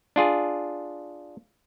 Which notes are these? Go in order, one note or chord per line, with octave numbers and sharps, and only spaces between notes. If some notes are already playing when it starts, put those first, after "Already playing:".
D4 F4 G#4